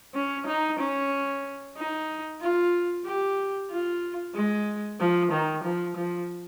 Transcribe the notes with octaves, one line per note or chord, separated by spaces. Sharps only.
C#4
D#4
C#4
D#4
F4
G4
F4
G#3
F3
D#3
F3
F3